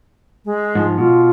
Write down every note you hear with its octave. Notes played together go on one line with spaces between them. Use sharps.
G#3
G#2 F3
B2 F4